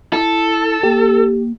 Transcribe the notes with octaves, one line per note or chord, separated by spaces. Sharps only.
E4 A4
A#3 G4